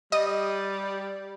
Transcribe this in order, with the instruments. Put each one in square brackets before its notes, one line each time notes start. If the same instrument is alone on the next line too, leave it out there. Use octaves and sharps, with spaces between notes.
[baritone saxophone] G3 [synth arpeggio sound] D#5 D#6